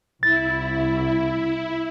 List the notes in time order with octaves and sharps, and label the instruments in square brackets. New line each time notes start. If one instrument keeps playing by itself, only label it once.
[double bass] C2 [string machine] E4 [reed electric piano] A6